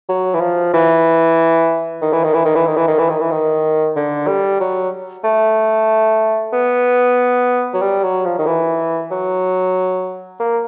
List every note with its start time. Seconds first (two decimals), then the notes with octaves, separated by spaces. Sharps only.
0.08 F#3
0.34 E3
0.40 F3
0.73 E3
2.01 D#3
2.13 E3
2.24 D#3
2.34 E3
2.45 D#3
2.55 E3
2.67 D#3
2.77 E3
2.88 D#3
2.99 E3
3.09 D#3
3.20 E3
3.31 D#3
3.96 D3
4.27 G3
4.60 F#3
5.24 A3
6.53 B3
7.74 F#3
7.82 G3
8.03 F#3
8.25 F3
8.39 D#3
8.46 E3
9.11 F#3
10.40 A#3